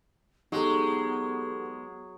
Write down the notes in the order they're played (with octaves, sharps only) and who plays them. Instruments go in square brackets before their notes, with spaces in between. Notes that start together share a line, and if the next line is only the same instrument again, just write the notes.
[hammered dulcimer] F#3 [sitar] G#3 [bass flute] B3 [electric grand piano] D#4 G4 A4